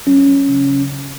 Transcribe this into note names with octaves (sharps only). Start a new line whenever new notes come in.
F#3 C#4
F#3
C#3